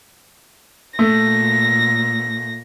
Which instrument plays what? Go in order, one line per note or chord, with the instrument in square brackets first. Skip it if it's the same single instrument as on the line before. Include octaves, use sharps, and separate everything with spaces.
[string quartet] A#2 A#6 [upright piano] A3